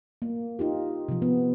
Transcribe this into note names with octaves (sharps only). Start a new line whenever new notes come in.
A#3
D#4 F4 G4
C3 F3
B3